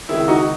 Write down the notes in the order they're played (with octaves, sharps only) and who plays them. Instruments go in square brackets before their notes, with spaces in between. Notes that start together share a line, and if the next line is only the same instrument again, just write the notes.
[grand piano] C#2 C3 D#3 E4 G#4
D#4 F#4